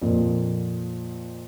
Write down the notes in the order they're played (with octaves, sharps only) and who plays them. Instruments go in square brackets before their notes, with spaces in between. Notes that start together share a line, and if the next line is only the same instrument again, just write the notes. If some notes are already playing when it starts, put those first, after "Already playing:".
[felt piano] F2 A#2